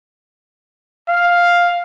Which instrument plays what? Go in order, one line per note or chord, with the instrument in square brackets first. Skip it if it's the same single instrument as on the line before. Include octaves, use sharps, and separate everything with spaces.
[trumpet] F5